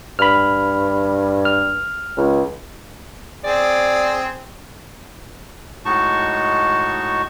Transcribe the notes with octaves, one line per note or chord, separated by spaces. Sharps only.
G2 B5 F6
F6
C#2
C4 G#4 D5
A2 G#3 D#4 F#4 A5 C#6